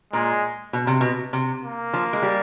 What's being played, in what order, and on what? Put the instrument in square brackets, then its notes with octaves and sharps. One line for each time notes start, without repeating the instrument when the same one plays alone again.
[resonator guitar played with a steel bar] A#2 [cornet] G#3
[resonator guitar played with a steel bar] B2
C3
B2
C3
[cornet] A#3
[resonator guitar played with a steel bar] F3
G#3
G3